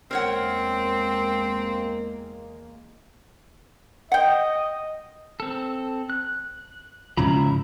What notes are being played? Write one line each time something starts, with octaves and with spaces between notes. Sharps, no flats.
E2 G#3 A#3 C4 A#4 C#5 F#5
D#5 F#5 G5
C4 A4
F#6
G#2 C#3 F3 E4 A#5 B5